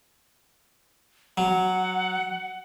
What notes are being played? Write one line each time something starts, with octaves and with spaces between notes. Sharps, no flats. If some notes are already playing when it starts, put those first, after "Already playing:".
F#3 F#5